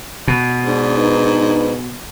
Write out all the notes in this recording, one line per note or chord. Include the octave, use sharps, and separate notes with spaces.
B2
G#2 D4
D4 D#4 B4